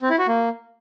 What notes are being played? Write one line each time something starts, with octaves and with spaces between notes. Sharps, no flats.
C4
E4
F#4
A#3